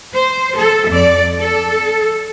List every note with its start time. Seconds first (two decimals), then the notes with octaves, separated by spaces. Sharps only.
0.15 C5
0.57 A4
0.89 F2 D5
1.41 A4